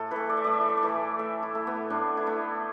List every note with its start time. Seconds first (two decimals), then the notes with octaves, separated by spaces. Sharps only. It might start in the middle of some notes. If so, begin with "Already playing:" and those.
Already playing: A2 A4
0.11 E3 A3 B4
0.29 D5
0.37 E5
0.44 A2 D5
0.53 E5
0.61 D5
0.69 E5
0.77 D5
0.83 E3 A3
1.19 A2 E5
1.43 E4
1.55 A3
1.67 B3
1.90 A2 D4
2.17 E4
2.27 A3 D4